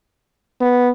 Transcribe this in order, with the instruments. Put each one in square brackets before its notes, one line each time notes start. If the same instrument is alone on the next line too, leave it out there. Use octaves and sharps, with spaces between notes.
[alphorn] B3